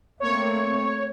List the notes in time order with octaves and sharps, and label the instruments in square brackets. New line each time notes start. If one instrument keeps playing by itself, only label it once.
[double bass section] A3 A#3 C4 [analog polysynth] C#5